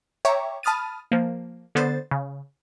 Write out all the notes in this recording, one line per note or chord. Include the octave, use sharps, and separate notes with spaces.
C#5 E5 G5 A#5 C#6 D6
A5 B5 D#6 F6 A6 D#7
F3 A#3
D3 B3 C5 A6
C#3